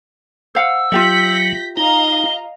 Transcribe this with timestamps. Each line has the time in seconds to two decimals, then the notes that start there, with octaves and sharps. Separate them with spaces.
0.55 C5 F5 F#5 E6
0.92 F#3 F4 G4 E5 G6 A#6 B6
1.77 D#4 D#5 F5 A#5 G7